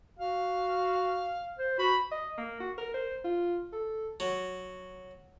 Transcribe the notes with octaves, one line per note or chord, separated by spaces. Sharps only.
F#4 F5
C5
F#4 B5
D#5
A#3
F#4
A#4
C5
F4
A4
F#3